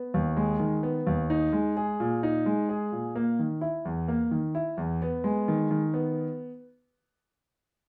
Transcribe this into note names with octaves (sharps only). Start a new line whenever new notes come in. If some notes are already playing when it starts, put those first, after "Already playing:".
Already playing: B3
D#2
G#3
D#3
B3
D#2
D#4
G#3
G#4
A#2
D#4
G#3
G#4
A#2
A#3
D#3
E4
E2
A#3
D#3
E4
E2
B3
G#3
D#3
D#3
B3